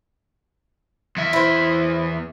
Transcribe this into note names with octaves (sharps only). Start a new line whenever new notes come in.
E2 E5
E4 C5